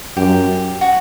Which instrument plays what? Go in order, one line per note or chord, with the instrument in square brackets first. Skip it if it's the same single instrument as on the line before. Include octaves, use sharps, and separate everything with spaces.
[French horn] F#2 [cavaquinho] G4
[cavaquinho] F#4